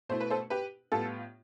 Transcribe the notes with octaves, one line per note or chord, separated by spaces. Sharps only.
B2 A3 E4 C5
B4
A4 C5
G4 B4
A2 G3 B3 F4 A4